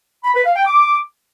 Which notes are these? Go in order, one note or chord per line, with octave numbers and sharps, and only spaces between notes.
B5
B4
F5
G5
D6